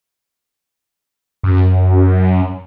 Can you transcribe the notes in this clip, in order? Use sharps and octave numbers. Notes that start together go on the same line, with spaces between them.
F#2